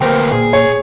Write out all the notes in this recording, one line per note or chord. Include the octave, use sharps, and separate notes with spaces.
D2 A#3 B4 C5 G5
A#2 G#4
C#5